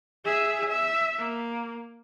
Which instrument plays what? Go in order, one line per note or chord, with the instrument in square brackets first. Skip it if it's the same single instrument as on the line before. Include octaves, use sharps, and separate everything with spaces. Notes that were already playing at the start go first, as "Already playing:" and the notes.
[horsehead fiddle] G#4 E5
E5
A#3